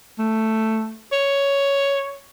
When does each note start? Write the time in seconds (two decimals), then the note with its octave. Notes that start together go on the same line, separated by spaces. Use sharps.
0.19 A3
1.12 C#5